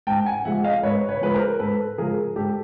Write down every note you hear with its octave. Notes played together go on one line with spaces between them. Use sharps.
G#2 G5 A5
F#5 G#5
F3 G#3 E5 F#5
D#5 F5
G#2 B4 C#5
B4 C#5
F3 G#3 B4
A#4 C5
G#2 A4 B4
F3 G#3 G#4 A#4
G#2 G4 A4